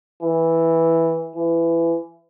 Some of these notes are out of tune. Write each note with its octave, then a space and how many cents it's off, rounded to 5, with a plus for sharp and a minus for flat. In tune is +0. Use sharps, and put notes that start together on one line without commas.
E3 -5
E3 +20